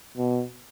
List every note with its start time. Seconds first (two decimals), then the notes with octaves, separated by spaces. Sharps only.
0.17 B2